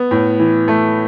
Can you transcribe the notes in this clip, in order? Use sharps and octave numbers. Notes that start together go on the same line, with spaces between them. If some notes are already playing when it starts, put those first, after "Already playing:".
Already playing: B3
A2
E3
A3